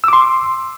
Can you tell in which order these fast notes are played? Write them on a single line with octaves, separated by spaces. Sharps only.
E6 D6 C6